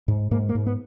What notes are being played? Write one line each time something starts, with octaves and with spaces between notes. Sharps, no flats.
G#2
G#2 A#3
A#3
G#2
B3